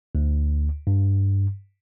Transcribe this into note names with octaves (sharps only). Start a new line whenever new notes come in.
D2
G2